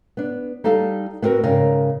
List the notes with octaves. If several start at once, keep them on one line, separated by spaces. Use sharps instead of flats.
B3 D4
G3 D#4 G4 A4 F5
B3 C4 F#4 A#4 B4
G#2 C#3 A#4 D5 G5